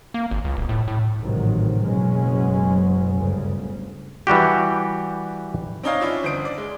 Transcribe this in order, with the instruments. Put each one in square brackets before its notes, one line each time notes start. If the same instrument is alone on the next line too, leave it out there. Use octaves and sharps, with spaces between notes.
[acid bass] A#3
G#1
C#2
D1
A2
A2
[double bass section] A1 G#2 C3 D#3 F#3
F#1 B2 F#3 G#3 C#4
G1 D2 C#3
[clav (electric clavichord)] E3 G3 F#4 G4
[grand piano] C4 D4 D#4 C#5 D#5 F5
C#4 D4 E4 F4
G1 C5 D#6 D7
D5
G#3